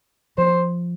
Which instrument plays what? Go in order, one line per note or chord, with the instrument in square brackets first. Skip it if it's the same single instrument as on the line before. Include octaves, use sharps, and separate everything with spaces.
[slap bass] F3 [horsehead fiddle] C5